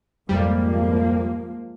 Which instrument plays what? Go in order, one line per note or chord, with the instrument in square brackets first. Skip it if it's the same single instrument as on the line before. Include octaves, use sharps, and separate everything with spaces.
[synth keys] F2 G3 [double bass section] G#2 F3 A#3